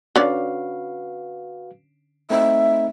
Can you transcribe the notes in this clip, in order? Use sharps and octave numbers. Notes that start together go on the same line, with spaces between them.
D3 C#4 F#4 B4 D5 F5
A3 C4 D#4 E5